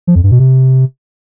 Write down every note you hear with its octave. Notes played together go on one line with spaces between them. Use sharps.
F3
F2
G2
B2
C3